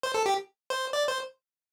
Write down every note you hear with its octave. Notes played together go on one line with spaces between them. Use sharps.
C5
A4
G4
C5
D5
C5